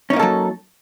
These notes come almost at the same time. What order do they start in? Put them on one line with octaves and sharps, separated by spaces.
C#4 D#4 A#3 A4 F#3